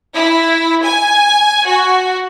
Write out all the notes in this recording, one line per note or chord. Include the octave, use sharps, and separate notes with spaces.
E4
G#5
F#4